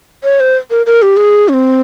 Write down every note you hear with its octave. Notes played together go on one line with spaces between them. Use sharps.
C#5
C5
A#4
A#4
G4
G#4
C#4
C4